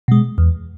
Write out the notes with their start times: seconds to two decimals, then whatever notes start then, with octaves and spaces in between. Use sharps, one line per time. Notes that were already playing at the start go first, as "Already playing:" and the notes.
0.08 B2 G#3
0.38 E2